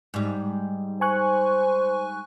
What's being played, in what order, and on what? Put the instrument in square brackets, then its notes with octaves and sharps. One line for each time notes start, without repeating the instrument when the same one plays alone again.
[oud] G#2 G3
[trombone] C5 [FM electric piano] G#5 C#6 F#6